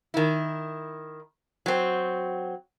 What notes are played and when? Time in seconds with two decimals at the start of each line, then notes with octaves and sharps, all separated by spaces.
0.14 D#3 E4
1.66 F#3 C4